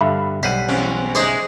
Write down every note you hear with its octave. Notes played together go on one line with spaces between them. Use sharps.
G2 D3 E5 F5 B5
B1 G3 C5 F#5 B6 D#7
E2 C4 C#4
G#3 D#4 G#4 C5 D5